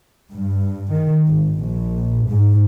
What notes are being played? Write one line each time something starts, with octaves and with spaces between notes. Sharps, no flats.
G2
D#3
G#1
A#1
G#2